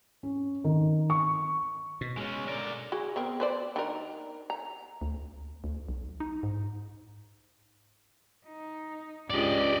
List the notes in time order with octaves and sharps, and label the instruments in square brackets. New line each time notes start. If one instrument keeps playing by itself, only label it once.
[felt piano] C#4
D#3
C#6
[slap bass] B2
[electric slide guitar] G#3 C#4
D3 A#4 D5
[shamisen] F#4 G#4
B3 C4 A#4
B4 C5 D5
D#3 D4 A#4
A#5
[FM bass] D2
D2
B1
D#4
G#2
[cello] D#4
[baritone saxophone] C#2 [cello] D4 G4 [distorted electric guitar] D5 D#5